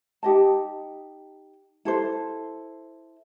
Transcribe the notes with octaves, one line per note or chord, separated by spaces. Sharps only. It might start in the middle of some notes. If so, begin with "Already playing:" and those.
D#4 G4 D#5 A5
E4 A4 C5